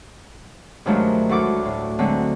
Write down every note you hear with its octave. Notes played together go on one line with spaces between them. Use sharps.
G2 D#3 F3 F#3 G#3 A3
D2 E4 F#4 A4 D6
A2
D3 F#3 G#3 C4